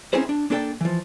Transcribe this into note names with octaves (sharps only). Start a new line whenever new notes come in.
C4 C#4 D#4 E4 G#4 C5
D4
A#3 D4 E4 A4 D5 G5
E3 F3